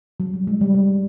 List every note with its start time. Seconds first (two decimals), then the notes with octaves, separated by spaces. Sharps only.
0.20 F#3
0.34 G3
0.47 G#3
0.61 G3
0.75 G3